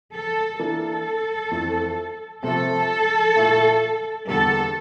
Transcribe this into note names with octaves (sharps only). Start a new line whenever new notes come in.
A4
E3 A#3 D4 A4
F2 E3 A3
C3 F3 A3 A4
A#2 A3 E4
E2 D3 G3 A#3 A4